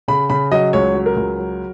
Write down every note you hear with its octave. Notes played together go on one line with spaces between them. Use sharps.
C#3 B5
C#3 B5
F#3 D#5
C#2 C#5
F#3
A#4
C#2
F#3